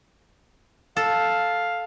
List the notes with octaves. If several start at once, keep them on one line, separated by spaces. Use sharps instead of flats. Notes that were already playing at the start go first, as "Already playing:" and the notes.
A4 F5